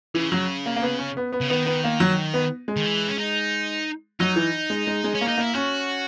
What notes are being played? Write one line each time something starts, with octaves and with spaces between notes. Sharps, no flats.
C#3 E3
F#3
A#3
A#3
B3
C#4
B3
B3
C#3
D#3 B3
B3
A#3
F#3
B3
G#3
D#3
E3
C#4
D#4
F#3 D#4
E3
G#3
G#3
G#3
C#4
A#3
D#4
A#3 E4
C#4 F#4